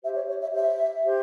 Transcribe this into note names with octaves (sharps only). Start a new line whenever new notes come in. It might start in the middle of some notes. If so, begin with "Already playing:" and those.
G4 C5 E5
C#5
C#5
E5
G4 C5 E5
G4 C5